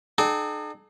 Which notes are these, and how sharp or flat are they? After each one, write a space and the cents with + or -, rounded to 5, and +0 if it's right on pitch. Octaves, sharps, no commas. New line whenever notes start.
D#4 -45 A4 -45 G5 -35